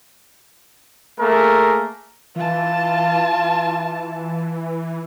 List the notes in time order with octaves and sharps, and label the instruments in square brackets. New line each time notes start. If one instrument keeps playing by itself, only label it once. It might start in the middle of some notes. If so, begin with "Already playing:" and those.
[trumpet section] A3 A#3 G#4 A#4
[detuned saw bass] E3 [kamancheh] F4 A5